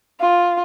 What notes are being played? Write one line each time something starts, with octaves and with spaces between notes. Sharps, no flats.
F4